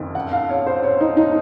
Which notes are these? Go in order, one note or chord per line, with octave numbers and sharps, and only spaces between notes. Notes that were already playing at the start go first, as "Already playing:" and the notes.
Already playing: F#1 F2 D#3
F#5
F5
C#5
C5
C#5
D#4
D#4